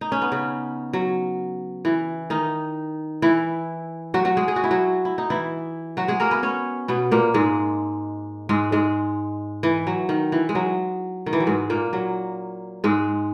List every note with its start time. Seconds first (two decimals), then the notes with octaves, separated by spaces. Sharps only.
0.01 D#4
0.12 C#4
0.22 B3
0.32 C#3 C#4
0.93 F#3
1.85 E3
2.30 D#3 D#4
3.22 E3 E4
4.14 F#3 F#4
4.25 F#3 F#4
4.37 G#3 G#4
4.48 G#4
4.56 F#4
4.64 E4
4.71 F#3 F#4
5.05 E4
5.18 D#4
5.30 E3 E4
5.97 F#3 F#4
6.08 G#3 G#4
6.20 A#3 A#4
6.31 B3 B4
6.43 C#4 C#5
6.88 B2 B3
7.11 A#2 A#3
7.34 G#2 G#3
8.49 G#2 G#3
8.72 G#2 G#3
9.63 E3
9.87 F#3
10.09 D#3
10.32 E3
10.49 G#3
10.55 F#3
11.26 D#3
11.33 E3
11.40 F#3
11.46 G#2 G#3
11.70 A#2 A#3
11.93 F#3
12.84 G#2 G#3